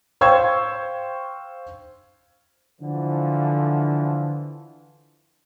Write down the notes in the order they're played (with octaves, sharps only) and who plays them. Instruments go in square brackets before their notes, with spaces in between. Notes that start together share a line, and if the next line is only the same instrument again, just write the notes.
[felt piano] C5 F5 G5 C#6 E6 G#6
[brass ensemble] D3 E3 F3